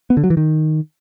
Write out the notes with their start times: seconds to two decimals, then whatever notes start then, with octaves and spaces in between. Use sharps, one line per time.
0.10 B3
0.17 D3
0.24 F#3
0.30 E3
0.37 D#3